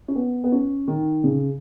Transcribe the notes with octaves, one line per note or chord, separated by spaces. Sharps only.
C#4
B3
B3
C#4
D#3
C#3